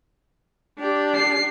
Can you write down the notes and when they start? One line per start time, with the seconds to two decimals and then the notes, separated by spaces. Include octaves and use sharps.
0.78 D4 G4
1.15 C7